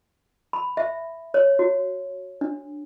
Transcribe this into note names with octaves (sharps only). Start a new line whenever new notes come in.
B5
E5
C#5
F#4
D4